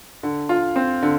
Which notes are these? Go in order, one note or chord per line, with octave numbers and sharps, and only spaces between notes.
D3
F4
C4
D3